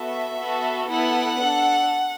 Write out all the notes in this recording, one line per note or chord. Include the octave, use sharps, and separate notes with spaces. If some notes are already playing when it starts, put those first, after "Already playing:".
Already playing: B3 F#4 A4 E5
B3 F#4 A4
B3 E4 A4 F#5
D4 A4